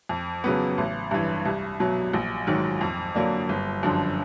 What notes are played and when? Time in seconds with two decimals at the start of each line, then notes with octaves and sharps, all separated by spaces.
0.09 F2
0.44 C#3 F#3 B3
0.78 A1
1.11 G2 E3
1.45 C2
1.80 B2 F#3
2.14 A#1
2.47 G#2 D#3 F#3
2.81 F2
3.15 D3 F#3 A#3 D4
3.49 G1
3.83 F#2 D3 F3